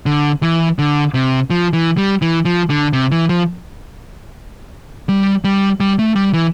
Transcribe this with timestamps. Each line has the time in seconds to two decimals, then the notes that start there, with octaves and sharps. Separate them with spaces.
0.06 D3
0.43 E3
0.79 D3
1.14 C3
1.50 F3
1.73 E3
1.97 G3
2.22 E3
2.45 F3
2.70 D3
2.93 C3
3.11 E3
3.29 F3
5.09 G3
5.44 G3
5.80 G3
5.99 A3
6.16 G3
6.33 E3